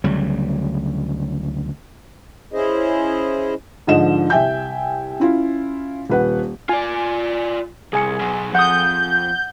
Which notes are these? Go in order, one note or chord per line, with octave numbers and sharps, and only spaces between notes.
D2 C#3 F#3 G3
C#3 C#4 E4 G#4 C5 D#5
G#2 D3 F3 D#5 E7
C2 E5 G5 G#5 G6
C#4 E4 F4
D#1 B4 F#5
F4 D5 G#5
C2 G#4 G#5 C#7
B2 F#3
F2 F#5 D#6 G6